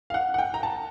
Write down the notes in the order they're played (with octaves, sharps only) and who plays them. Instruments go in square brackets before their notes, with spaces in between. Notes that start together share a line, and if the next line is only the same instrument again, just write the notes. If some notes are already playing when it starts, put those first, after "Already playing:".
[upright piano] F5
F#5
F#5
G5
A#5
A5